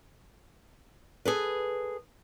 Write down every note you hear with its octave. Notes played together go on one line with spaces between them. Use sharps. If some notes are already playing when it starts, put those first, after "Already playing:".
G#4 A4 B4